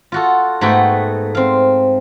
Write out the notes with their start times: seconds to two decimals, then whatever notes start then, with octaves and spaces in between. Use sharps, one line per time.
0.12 F4 F#4 A4
0.61 G#2 A3 B3 F#4 A4 G5
1.35 C4 F5